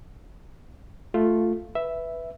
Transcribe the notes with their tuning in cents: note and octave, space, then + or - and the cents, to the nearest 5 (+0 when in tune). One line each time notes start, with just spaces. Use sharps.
A3 +0 F4 +0
B4 +0 E5 +0